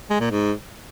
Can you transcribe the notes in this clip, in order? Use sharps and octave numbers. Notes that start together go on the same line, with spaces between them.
G#3
A#2
G#2